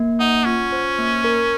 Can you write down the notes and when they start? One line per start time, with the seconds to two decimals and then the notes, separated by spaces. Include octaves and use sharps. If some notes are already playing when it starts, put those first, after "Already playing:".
Already playing: A#3
0.20 D#4 F#5
0.46 C#4 F4
0.72 C5
0.99 A#3
1.24 A#4